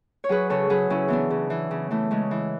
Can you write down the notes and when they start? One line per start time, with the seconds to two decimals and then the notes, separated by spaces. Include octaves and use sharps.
0.24 C#5
0.29 F#3 G#4 B4
0.50 C#3 A4 C#5
0.70 F#3 G#4 B4
0.90 C#3 C#4 E4
1.08 E3 B3 D4
1.30 C#3
1.50 E3
1.71 C#3
1.91 E3 A3
2.11 C#3 G#3
2.31 E3